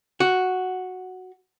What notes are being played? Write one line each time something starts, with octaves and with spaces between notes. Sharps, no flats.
F#4